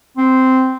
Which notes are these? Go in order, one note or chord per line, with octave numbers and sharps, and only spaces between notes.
C4